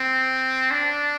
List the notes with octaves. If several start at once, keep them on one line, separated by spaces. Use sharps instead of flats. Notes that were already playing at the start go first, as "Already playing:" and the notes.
Already playing: C4
D4